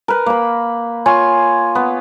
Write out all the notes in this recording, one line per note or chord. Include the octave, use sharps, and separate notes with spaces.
A#4 B4
A#3 B5
F4 C#5 G#5 C#6
B3